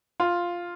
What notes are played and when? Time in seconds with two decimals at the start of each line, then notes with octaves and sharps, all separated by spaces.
0.20 F4